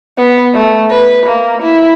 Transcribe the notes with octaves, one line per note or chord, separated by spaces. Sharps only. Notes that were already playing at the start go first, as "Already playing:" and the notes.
B3
A3
B4
A#3
E4